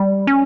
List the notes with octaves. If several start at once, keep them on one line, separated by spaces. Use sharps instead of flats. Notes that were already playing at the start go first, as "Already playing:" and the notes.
Already playing: G3
C#4